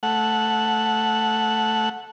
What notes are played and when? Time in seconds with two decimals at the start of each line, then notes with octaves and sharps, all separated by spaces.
0.03 A3 F#5